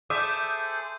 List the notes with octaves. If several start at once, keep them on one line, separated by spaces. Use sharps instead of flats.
G#4 A4 C5 E5 D6 D#6 G6 D#7